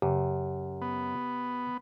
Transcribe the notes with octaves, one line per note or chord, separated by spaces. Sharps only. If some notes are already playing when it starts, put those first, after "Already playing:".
F#2 C#3 G4
B3